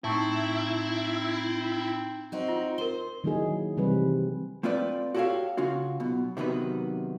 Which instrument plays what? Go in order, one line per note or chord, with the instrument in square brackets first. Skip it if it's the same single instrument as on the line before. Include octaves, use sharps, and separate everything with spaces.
[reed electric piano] A2 A5 C#6 [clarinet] C4 [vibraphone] D#4 A#5 [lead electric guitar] E4
[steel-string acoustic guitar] C4 D#4 F#4
[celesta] F4
[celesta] A#4 G7 [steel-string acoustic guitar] C5
[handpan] D#3 F#3 A#3 D#4 E4 G#4
C3 E3 G3 C4 B4
[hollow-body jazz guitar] A3 C4 F4 B4 D5
F#4 G4 A4 C5 C#5 F5
C#3 C#4 F4 F#4
B1 B2
C3 D#3 F#3 B3 B4